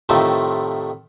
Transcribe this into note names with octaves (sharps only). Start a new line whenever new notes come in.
A2 C3 D#3 F3 A3